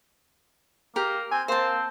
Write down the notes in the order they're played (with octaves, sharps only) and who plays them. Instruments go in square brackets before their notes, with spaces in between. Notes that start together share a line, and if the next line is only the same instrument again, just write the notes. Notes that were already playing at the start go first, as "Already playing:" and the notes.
[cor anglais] A#3 [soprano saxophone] G4 [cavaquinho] A#4
[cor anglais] C4 [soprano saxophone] G#5
[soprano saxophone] A#3 [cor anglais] C4 [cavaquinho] C5 A5